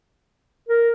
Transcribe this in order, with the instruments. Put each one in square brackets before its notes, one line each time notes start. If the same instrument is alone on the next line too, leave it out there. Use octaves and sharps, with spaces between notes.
[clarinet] A#4